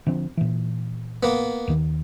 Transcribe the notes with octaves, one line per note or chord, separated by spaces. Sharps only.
D3 F3 C4
A#2 E3
A#3 B3
D#2 D#3